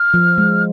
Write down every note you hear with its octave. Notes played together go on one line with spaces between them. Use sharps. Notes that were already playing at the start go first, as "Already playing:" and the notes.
Already playing: F6
F3
G#3